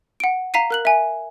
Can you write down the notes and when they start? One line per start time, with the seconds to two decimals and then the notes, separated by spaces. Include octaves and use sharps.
0.20 F#5 D7
0.54 F5 A#5 B6 C7 D#7
0.71 A#4 F#6 F#7
0.85 E5 G#5